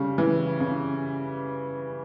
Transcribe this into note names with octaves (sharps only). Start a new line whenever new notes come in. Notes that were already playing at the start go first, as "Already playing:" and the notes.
Already playing: C#3 G3
E3
C#3